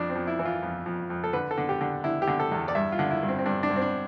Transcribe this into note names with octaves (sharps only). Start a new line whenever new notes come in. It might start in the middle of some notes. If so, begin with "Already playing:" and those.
Already playing: F2 D4
C4
F2
E4
E3
F4
F2
F2
F2
A4
D3 B4
A4
D3
G4
D3
D3 E4
G4
D3
A4
E2
D5
G2 E5
F4
D3
E4
G2
C4
C4
G2 D4
D4
G2
C4
D4